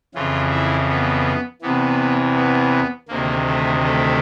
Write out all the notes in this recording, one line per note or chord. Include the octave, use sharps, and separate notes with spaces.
F2 C#3 E3 F4
E4
B3
E2 C3 E3 B3
B3
D2 C3 D#3 A#3
A3
A3